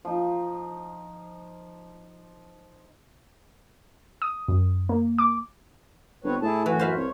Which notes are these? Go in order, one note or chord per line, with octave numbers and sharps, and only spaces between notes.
F3 D#4
D#6
F#2
A#3
D6
G1 C4 B4 C#5
A2 E4 G#4 A5
F#2 E3 F#4
C5 F5 B5
C2 C#5